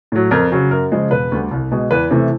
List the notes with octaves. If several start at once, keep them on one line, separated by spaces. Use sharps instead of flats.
A2 F#3
F2 A#4
C#3 F#3
F#2 A#4
C#3 F3 G#3
E1 B4
D2 D3 G3
C2
B2 G#3
E2 B4
C3 E3 A3